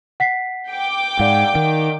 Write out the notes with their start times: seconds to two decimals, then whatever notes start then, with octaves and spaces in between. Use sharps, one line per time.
0.20 F#5 B6 C7
0.71 G5 D6
1.20 G#2 D5 F5 F#5
1.55 D#3